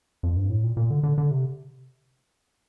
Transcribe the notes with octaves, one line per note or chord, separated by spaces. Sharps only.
F2
G2
A2
A#2
A#2
D3
D3
D3
C3